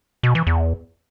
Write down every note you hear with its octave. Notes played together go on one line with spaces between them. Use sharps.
B2
E3
E2